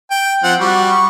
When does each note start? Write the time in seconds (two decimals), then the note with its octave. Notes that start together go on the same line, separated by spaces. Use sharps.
0.11 G5
0.43 F3 C4 F#5
0.60 G3 F#4
0.91 C#6